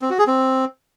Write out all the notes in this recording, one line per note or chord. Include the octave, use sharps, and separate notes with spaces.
C4
F#4
G#4
C4